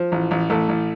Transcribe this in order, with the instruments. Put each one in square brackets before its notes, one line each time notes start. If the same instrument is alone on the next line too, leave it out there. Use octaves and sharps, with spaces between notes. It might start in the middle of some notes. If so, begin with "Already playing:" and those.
Already playing: [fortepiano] F3
A1
A1
A1 A3 A4
A1